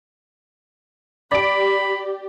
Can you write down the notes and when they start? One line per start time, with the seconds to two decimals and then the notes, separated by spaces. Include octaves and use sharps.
1.32 G4 D5 B5 D7